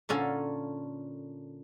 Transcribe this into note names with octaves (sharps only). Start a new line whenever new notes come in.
A#2 D3 C#4 A4 F5